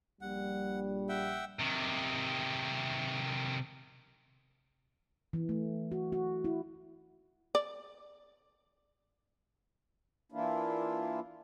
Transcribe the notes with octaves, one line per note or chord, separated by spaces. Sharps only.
A#1 G3 F#5
E5 F#5 G5
C3 D#3
E3
A3
F#4
F#4
E4
D5
E3 A#3 D4 E4 F4